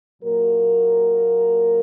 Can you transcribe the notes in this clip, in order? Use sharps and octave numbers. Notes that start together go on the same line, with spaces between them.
A#2 F#3 A#3 A#4